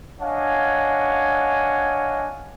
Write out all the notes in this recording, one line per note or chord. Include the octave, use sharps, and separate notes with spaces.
D4 C#5 D#5 F5 F#5 G#5